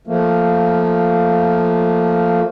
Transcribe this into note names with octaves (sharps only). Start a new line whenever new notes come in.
F3 A3 A#3